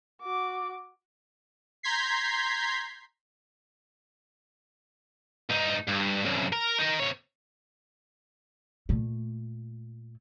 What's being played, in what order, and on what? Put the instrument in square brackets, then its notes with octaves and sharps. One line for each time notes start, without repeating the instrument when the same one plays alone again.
[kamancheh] F#4 D6
[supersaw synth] A#5 C6 G6 G#6 B6 C7
[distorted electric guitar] G2 D#4
G2
C2 F#2
A#4
D#4 A#4
C3 C#5
[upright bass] A#2 A3